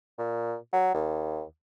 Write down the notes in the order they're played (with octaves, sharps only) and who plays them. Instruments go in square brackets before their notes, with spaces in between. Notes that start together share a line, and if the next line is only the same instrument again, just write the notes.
[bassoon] A#2
F#3
D#2